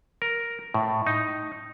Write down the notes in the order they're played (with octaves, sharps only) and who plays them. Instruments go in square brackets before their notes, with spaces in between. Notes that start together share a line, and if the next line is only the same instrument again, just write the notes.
[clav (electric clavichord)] A#4
A2
D#4